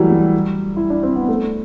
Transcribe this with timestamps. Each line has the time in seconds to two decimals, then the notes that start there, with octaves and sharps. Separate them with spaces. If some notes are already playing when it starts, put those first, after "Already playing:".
Already playing: E3 F#3 G3 A3
0.11 G3
0.77 E4
0.90 D4
1.03 C4
1.16 B3
1.29 A3